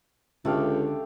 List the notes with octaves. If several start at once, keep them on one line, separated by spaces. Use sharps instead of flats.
C#2 D3 A3 G4 F5